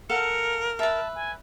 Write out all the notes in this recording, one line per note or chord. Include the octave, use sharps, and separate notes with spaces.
A4 A#4 F5 F#5 C#7
B4 E5 A5
G#5